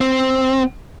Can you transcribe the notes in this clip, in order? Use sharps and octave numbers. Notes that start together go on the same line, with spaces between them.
C4